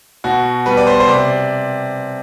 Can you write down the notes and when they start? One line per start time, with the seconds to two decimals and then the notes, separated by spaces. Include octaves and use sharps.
0.24 B2 F#4
0.66 G3 B3 B4
0.77 D5
0.87 C5
1.00 C5
1.08 C3 D5